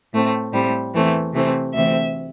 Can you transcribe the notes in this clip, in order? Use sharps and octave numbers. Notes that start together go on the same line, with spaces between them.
A2 A3 C4
A2 G3 C4
E2 E3 A3 C4
C3 E3 A3 C4
D2 C3 E3 A3 C4 E5